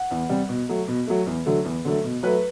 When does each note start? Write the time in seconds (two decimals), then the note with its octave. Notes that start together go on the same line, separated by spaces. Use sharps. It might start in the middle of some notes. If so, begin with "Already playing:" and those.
Already playing: F#5
0.11 E2
0.29 C3 G3
0.49 B2
0.69 F#3 A3
0.88 B2
1.07 F#3 A3
1.26 E2
1.46 D3 F#3 A3
1.65 E2
1.85 D3 F#3 A3
2.04 B2
2.23 F#3 A3 B4